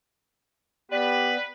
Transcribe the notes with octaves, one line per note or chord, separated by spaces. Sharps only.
B3 G4 B4 D5